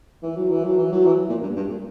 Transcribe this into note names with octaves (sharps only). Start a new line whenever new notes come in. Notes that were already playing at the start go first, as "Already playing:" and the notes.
E3
F#3
E3
F#3
E3
F#3
E3
A#2
G2
G2
A#2